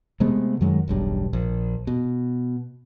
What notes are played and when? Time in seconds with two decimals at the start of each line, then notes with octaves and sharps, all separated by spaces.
0.20 C3 G#3 A3 B3
0.61 F#2 D#3 F#3 G#3
0.88 E1 B1 G2
1.33 A#1
1.87 B2